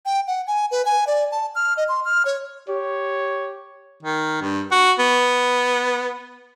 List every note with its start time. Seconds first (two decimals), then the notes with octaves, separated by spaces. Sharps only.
0.05 G5
0.27 F#5
0.47 G#5
0.71 B4
0.85 G#5
1.07 D5
1.32 A5
1.55 F6
1.77 D#5
1.88 C6
2.05 F6
2.25 C#5
2.69 G4 C#5
4.03 D#3
4.41 G2
4.71 F#4
4.99 B3